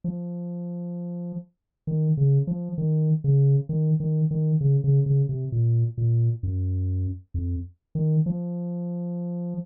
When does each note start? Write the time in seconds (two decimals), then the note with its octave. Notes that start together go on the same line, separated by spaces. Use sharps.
0.04 F3
1.87 D#3
2.17 C#3
2.47 F3
2.78 D#3
3.24 C#3
3.69 D#3
4.00 D#3
4.31 D#3
4.61 C#3
4.84 C#3
5.06 C#3
5.29 C3
5.52 A#2
5.98 A#2
6.43 F#2
7.34 F2
7.95 D#3
8.26 F3